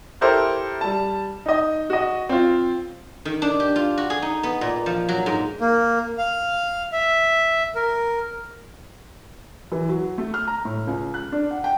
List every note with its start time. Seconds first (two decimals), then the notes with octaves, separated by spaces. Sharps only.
0.21 E4 G4 A4 A#4 C5
0.81 G3 A5
1.46 D#4 D#5
1.90 F#4 D#5
2.29 C4 F4
3.25 D#3
3.42 D4
3.60 G4
3.76 F4
3.98 F#4
4.10 G#4
4.22 D#4
4.43 B3
4.61 A#2
4.86 F3
5.09 F#3
5.26 G#2
5.61 A#3
6.18 F5
6.92 E5
7.75 A#4
9.72 E3
9.89 F#3
10.18 A3
10.34 F6
10.47 A#5
10.65 A2
10.87 C#2
11.14 F#6
11.32 D4
11.51 F#5
11.64 G5